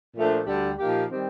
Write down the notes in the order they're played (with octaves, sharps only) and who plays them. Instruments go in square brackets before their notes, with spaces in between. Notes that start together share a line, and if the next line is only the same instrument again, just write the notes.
[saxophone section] A#2 F3 A3 D4
D2 D3 G3 D4 G4
A#2 F3 A#3 D#4 G4
D#3 G3 C4 G4